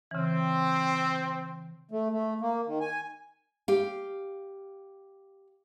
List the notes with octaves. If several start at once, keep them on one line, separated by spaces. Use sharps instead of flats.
C#3 E3 C4
A3
A3
A#3
D#3
G#5
G4 F5